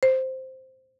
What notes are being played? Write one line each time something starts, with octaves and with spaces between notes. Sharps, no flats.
C5